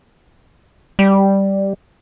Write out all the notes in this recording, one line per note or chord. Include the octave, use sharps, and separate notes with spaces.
G3